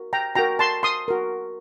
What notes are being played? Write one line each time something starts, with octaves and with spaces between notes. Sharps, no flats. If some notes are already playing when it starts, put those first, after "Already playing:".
Already playing: F#4 A#4
G5 A#5
F#4 A#4 G5 A#5
A5 C6
C6 D#6
F#4 A#4